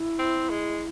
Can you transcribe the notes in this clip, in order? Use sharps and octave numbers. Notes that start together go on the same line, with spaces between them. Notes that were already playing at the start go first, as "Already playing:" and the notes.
Already playing: E4
C4
G#3